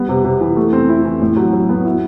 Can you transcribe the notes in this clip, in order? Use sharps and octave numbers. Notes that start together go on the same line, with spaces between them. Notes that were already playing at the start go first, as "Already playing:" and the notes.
Already playing: G3 B3
C3
C3
E3
A3
C4
E4
E3
A2
F#3
F#3
B3
E4